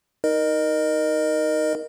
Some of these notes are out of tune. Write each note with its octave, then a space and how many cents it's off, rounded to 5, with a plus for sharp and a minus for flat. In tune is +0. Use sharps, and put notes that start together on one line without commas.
D#4 +15 A#4 +10 D#5 -25